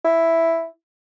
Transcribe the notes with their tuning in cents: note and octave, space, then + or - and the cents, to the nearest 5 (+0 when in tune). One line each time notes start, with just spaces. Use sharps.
E4 +0